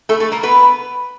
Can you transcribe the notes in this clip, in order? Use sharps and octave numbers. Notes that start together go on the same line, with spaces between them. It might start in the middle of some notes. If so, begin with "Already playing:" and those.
A3 A4
A3 A4
A#3 A#4
B3 B4